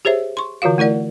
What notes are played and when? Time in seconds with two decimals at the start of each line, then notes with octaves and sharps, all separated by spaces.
0.05 G4 G#4 C5 C#5 E5
0.37 C6 C#6
0.62 D3 E3 F4 F#4 F5
0.78 A3 E4 A#4 D5 F#5